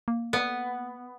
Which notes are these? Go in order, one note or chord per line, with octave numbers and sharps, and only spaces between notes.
A#3
B3